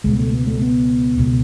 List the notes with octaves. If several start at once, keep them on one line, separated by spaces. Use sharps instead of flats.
C#2 B2 G#3
A3
B3
A3
B3
C#2 B2